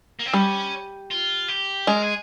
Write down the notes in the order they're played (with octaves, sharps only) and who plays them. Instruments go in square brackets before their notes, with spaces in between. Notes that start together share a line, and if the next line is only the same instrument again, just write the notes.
[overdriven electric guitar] A#3
C4
[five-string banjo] G3 [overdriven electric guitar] C#4
[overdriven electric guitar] F4
G4
[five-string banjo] G#3 [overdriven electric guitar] A#4
[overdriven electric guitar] G#4